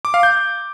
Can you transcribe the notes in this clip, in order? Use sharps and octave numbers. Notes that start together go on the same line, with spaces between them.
D6
F5
G6